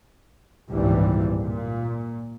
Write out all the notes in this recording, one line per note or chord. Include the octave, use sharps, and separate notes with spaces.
G#1 C#2 G2 A#2 E3 G3
A#2